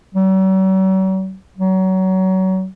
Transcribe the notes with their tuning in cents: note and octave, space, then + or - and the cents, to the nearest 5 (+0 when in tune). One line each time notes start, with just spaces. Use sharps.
F#3 +45
F#3 +25